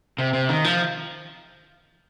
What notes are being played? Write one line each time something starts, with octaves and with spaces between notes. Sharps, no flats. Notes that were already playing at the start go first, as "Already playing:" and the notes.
C3
C3
D#3
F3